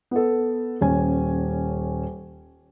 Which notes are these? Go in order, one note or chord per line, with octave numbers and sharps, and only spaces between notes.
B3 A4
D#1 C#4 G#5